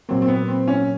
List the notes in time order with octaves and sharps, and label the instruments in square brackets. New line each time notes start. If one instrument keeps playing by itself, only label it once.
[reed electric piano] A#2 F#3 A#3 [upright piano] C4
[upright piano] C4
B3
C4
C#4